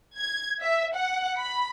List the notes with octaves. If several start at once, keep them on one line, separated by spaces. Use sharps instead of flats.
G#6
E5
F#5
B5